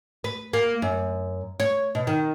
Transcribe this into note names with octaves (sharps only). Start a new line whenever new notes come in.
B4
A#3
F#2
C#5
B2
D#3